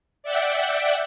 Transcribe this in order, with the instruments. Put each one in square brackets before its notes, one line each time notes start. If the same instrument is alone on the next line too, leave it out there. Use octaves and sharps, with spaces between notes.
[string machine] D5 E5 F#5 G5